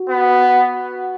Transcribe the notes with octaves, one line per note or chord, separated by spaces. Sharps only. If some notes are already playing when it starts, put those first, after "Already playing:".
Already playing: F#4
B3